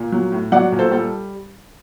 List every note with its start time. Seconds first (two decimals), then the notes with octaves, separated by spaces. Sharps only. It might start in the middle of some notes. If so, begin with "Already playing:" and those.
Already playing: A#2
0.12 F#3
0.32 A2
0.52 F#3 D5 F#5
0.72 A#2
0.79 A4 C5
0.91 G3 A4